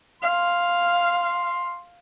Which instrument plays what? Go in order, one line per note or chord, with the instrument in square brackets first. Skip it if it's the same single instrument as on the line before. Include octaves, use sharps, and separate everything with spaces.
[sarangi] F5 [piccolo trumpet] C6